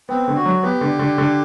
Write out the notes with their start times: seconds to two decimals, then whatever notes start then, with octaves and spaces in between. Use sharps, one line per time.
0.09 B3 C4
0.28 D3
0.36 F#4
0.45 F#3
0.63 B3 G4
0.81 D3
0.99 D3
1.18 D3